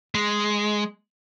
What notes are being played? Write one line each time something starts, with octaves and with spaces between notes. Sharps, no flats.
G#3